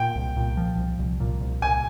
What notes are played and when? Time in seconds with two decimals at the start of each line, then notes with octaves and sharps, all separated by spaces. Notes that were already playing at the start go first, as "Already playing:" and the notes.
Already playing: A#2 G5
0.15 C2
0.37 A#2
0.57 F3
0.78 C2
0.99 C2
1.20 A#2
1.41 C2
1.62 C2 G#5